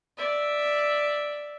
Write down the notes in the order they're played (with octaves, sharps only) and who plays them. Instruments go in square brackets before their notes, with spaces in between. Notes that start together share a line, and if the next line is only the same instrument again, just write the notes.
[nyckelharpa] D5 E5